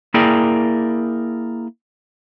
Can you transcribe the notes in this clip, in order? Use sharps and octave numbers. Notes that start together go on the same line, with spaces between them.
A#3 E4 G#4 A#4 D5 G5